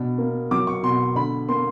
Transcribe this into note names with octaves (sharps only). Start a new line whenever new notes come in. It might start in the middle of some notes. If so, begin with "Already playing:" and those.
Already playing: B2 D4
A#3
F#3 D6
C#6
B2 C6
D3 B5
A#3 C6